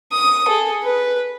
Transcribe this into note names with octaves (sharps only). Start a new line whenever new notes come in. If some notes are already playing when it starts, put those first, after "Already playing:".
D#6
G#4 A4
B4